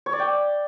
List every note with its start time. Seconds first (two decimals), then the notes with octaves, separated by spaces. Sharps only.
0.06 C#5
0.13 D5
0.19 G5